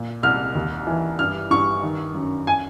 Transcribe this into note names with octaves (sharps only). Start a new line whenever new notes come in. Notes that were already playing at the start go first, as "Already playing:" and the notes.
Already playing: A#2
C2 F6
D#2
E3
G2 F6
G2 C#6
D#3
F#2
G#5